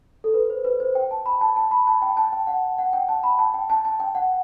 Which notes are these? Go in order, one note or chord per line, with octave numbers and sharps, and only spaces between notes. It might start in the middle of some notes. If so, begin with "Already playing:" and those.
A4
B4
C5
B4
C5
G5
A5
B5
A5
A5
B5
A5
G5
A5
G5
F#5
F#5
G5
A5
B5
A5
G5
A5
A5
G5
F#5